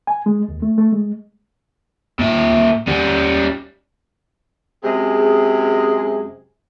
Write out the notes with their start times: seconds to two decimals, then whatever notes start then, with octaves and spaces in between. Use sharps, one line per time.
0.07 G#5
0.26 G#3
0.48 D#2
0.62 A3
0.78 A3
0.93 G#3
2.19 A#2 E5
2.87 G3 C#4
4.84 F#2 C3 G#3 G#4